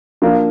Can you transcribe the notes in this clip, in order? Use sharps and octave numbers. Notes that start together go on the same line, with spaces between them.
F3 A#3 D4